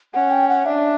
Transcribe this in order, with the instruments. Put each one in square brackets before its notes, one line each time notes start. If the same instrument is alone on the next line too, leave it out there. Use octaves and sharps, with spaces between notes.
[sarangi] C#4 [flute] F#5
[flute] G5
F#5
[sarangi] D4 [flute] E5